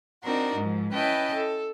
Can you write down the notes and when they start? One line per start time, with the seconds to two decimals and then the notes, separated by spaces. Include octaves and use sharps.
0.23 C4 D4 D#4 F#4 A#4
0.56 G#2 F3
0.92 C#4 E4 B4 D#5 G5 A5
1.35 A4